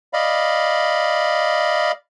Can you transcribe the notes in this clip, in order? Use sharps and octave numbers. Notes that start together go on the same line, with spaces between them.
D5 D#5 F5 B5